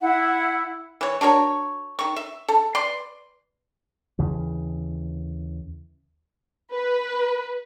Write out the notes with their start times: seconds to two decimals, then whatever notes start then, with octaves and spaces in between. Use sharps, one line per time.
0.01 E4 F#5
1.01 E3 C#5
1.21 D4 F#4 A#4 C#5
1.99 D#3 C#6
2.16 E5
2.48 A4
2.75 B4 D5 C6
4.19 D#2 C#3 E3
6.73 B4